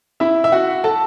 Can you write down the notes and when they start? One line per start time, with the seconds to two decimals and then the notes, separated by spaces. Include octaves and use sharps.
0.20 E4 E5
0.44 E5
0.52 F#4 F#5
0.84 A4 A5